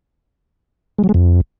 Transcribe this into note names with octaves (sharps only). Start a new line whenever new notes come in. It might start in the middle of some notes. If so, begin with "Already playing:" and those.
G#3
F#3
G#3
F2